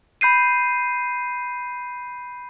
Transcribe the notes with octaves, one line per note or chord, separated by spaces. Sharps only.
B5 G6 C7 D#7